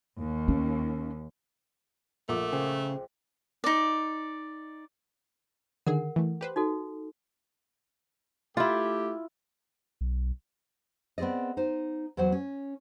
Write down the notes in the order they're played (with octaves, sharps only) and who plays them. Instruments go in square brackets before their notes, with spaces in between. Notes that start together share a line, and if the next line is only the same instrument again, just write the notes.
[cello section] D#2
[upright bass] C#4
[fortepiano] A#1 [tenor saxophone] A3 [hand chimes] A#4 F#5 D6
[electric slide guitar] C#3 [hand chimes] G#4 C5 G5
[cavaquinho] D#4 D5
[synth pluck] D3 D#3 G#4 [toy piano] A#4 F#5
[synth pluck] E3 A3
G4 B4 C5
[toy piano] D#4 F#4 A4
[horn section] A3 G4 [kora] E4 F4
[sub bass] B1
[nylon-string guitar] B3 C4 G#4 D5 D#5
D#4 C5
E2 F#3 F#4 C5 F#5
C#4